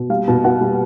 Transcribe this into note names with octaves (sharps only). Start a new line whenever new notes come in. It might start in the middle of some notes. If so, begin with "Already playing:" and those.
Already playing: B2
G3 F5
B2
B2 F#5
G3